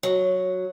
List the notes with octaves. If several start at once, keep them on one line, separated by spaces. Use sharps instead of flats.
F#3